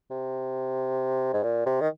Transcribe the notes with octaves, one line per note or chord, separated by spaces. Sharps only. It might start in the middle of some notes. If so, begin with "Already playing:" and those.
C3
G#2
A#2
C3
D#3